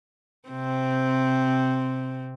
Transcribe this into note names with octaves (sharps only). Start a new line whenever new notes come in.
C3 C4